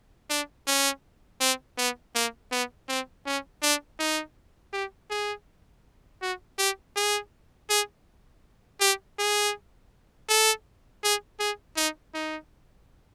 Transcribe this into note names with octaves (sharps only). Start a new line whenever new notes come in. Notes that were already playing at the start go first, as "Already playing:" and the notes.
D4
C#4
C4
B3
A#3
B3
C4
C#4
D4
D#4
G4
G#4
F#4
G4
G#4
G#4
G4
G#4
A4
G#4
G#4
D#4
D#4